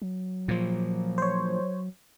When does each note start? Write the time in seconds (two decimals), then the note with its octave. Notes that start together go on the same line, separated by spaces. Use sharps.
0.02 F#3
0.48 A#2 F3
1.18 C5 C#5